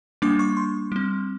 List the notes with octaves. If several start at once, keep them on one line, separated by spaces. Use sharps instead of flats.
G3 A#3 D4 D6
C#6
C6
G3 C4